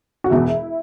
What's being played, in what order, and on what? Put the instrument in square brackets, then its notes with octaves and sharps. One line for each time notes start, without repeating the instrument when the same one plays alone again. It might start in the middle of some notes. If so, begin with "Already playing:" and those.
[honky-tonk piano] F#4
[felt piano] E1 E2 B2 [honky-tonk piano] E4